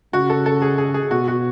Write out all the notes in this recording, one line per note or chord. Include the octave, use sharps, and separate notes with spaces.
C#3 F#4
A4
A4
G#4
G#4
G#4
B2 F#4
F#4